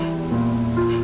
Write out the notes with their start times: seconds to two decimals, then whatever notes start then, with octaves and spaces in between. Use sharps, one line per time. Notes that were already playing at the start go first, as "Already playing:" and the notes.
Already playing: E2 G3 E4
0.31 A#2
0.77 F4